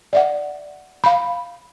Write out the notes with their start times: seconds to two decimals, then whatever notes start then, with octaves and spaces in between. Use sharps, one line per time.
0.13 D5 E5 F#5
1.04 F5 B5